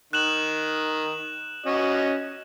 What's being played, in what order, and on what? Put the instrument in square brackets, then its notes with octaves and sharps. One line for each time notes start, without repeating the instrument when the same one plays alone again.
[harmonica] D#3 [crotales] F#6 E7 F#7
[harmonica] C#4 F#4 D#5